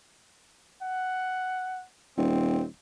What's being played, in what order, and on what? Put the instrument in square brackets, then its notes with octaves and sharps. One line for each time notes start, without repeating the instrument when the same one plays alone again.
[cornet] F#5
[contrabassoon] D#1 [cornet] C4